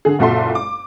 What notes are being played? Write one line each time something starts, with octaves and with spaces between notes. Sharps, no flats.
D3 G#4
F#1 A#2 F#4 A4 E5 C6
D6